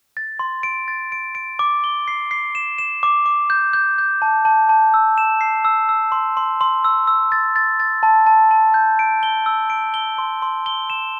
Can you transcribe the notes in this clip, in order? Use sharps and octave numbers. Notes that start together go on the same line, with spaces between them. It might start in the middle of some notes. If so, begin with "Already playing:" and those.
A6
C6
D7
A6
D7
D7
D6
G7
C7
C7
E7
E7
D6
D6
G6
G6
G6
A5
A5
A5
E6
E7
C7
E6
E6
C6
C6
C6
E6
E6
A6
A6
A6
A5
A5
A5
G6
D7
G7
E6
D7
G7
C6
C6
G7
E7